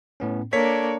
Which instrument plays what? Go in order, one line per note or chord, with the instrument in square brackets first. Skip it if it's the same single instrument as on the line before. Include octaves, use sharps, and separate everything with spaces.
[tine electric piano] A2 B3 C#4
[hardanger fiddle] A#3 D4 [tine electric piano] A4 [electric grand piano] C#5 B6